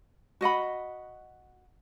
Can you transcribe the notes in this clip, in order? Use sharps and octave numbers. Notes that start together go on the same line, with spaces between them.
F#4 D#5 F#5 B5